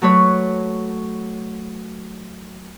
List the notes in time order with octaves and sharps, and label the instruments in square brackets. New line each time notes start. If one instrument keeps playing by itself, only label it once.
[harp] F#3 A3 B4 C#5